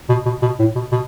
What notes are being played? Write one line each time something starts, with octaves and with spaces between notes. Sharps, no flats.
B2
B2
B2
A2
B2
B2